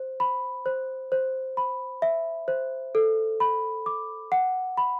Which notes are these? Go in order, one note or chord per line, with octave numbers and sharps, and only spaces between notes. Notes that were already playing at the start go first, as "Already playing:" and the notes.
Already playing: C5
B5
C5
C5
B5
E5
C5
A4
B5
D6
F#5
B5